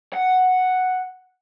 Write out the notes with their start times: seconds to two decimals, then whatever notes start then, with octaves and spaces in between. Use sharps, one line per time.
0.13 F#5